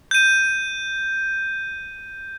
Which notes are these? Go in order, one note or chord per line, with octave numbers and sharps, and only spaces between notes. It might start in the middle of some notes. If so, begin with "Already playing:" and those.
G6 D#7